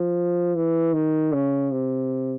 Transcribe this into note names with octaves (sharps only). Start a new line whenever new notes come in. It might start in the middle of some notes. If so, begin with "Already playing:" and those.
Already playing: F3
E3
D#3
C#3
C3